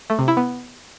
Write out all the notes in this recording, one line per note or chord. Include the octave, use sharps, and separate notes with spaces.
A3
C3
E4
B3